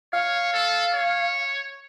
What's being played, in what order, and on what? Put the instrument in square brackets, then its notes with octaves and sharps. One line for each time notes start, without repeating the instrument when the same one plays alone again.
[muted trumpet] C#5 [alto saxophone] F5
[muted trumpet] A4
C#5